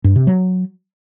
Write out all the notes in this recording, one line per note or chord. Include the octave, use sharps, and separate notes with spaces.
G2
C3
F#3